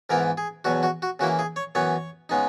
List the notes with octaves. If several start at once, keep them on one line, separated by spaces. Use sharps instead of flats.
G#2 E3 B3 E4 A#4
G#4
E2 B2 F#3 F#4
F#4
F#4
C#3 E3 A#3 E4 F#4
G#4
C#5
F#2 E3 B3 C#5
C#3 G#3 B3 D#4